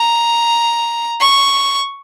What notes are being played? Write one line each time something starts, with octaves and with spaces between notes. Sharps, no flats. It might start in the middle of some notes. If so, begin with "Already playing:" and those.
Already playing: A#5
C#6